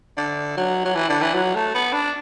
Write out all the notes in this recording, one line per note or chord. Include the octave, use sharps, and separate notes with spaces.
D3
F#3
F#3
E3
D3
E3
F#3
A3
B3
D4